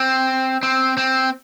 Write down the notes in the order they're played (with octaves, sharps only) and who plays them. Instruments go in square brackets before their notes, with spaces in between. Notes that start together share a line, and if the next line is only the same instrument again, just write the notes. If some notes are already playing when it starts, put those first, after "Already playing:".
Already playing: [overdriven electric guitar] C4
C4
C4